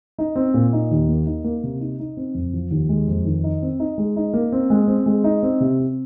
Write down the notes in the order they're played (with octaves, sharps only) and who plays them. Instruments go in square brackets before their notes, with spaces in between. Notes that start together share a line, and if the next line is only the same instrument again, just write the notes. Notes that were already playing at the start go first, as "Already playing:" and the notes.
[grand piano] D#4
C4
A#2
D#4
D#2
A#3
D#4
A#3
C3
D#4
D#4
C4
F2
F3
D#2
G#3
F2
D#3
D#4
C4
D#4
G#3
D#4
A#3
C4
G#3
C4
G#3
D#4
C4
C3
C4